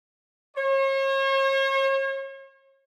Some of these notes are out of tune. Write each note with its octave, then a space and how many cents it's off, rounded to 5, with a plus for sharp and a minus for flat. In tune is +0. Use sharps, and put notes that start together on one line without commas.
C#5 -40